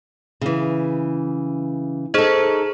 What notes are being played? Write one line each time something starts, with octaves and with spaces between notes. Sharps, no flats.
C#3 E3
D#4 G#4 A4 C5 D#5